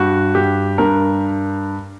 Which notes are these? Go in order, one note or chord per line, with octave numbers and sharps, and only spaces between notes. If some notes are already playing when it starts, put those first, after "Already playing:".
Already playing: G2 F#4
G2 G4
G2 A#4